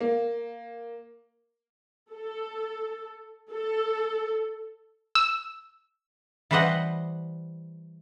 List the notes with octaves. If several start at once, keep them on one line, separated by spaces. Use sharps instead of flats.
A#3
A4
A4
E6
E3 G3 B4 C5 D#5 F#5